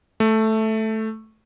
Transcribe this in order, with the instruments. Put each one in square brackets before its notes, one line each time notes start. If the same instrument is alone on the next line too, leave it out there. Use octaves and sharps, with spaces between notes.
[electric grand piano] A3